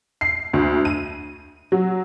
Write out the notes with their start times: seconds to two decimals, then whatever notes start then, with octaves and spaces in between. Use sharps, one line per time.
0.21 C7
0.53 D2
0.85 D#7
1.72 F#3